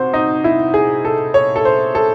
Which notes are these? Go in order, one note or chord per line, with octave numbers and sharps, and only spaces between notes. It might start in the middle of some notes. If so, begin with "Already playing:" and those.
Already playing: C3 F#4 C5
D#4
E4
G#4
A4
C#5
A4
C5
A4